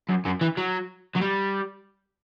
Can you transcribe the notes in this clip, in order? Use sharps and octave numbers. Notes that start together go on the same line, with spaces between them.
F#2
F#2
E3
F#3
F#3
G3